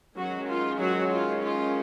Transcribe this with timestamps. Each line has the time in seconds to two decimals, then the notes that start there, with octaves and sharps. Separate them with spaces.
0.16 D#3 F#3 G#3 C#4 F#4
0.49 F4
0.80 F#3 F#4
1.11 F4
1.43 F4